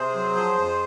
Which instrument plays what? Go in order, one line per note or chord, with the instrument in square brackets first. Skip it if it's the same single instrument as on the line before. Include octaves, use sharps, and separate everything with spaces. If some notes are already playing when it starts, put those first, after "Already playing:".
Already playing: [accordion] C3 G#4 C5
F#3
F3
F2